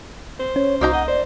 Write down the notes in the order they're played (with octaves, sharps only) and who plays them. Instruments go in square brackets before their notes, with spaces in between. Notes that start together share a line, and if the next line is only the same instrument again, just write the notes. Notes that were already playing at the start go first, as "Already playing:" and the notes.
[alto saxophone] C5
[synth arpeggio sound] C#4 [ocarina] C#5
[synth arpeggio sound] C2 G6 [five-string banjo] A#3 D#4 A#5 [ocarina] F#4
[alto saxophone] D#5 [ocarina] F#5
[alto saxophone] C5 [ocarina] D5